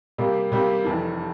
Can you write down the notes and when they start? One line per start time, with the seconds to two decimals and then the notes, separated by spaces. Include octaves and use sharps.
0.18 C3 G3 A#3
0.52 C3 G3 A#3
0.85 F1 F2 E3